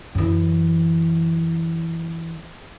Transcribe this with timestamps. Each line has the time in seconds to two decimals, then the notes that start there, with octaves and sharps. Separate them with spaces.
0.15 F#2 E3